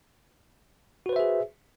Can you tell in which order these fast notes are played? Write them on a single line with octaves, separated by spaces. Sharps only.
F#4 B4 C5 E5 G#4